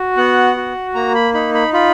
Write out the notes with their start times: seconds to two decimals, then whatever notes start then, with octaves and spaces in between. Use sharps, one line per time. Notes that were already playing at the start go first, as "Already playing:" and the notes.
Already playing: F#4
0.17 B3 F#5
0.56 F#4
0.95 A#3 A#5
1.15 B5
1.34 D#4 B5
1.54 B5
1.73 F4 B5